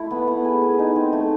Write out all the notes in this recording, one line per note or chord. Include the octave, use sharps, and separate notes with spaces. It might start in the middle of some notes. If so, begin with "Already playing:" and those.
Already playing: A3 E4
B3
B3
G#4
G#4
D#4
C4
A3